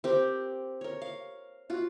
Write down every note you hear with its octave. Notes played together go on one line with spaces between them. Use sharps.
C4 G4 A#4
A#4 C#5
F5
F4 F#4